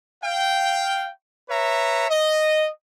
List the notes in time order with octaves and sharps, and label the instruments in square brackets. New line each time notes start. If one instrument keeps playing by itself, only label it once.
[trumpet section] F5 G5
B4 C#5 E5 A#5
D#5